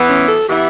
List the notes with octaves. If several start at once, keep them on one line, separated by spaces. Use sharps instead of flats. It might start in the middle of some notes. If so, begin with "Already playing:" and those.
Already playing: E3 B3 E4
C#4
A4
E3 B3 E4 G4